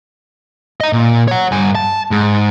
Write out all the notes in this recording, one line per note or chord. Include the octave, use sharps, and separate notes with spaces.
D#5 A#5
A#2
C#5 F#5
G2 G#5
A5
G#2